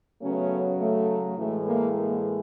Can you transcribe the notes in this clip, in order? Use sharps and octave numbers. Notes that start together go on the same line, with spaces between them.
C#3 F#3 A3 B3 C#4
A3
A2 E3 G#3 A3
A#3
A#3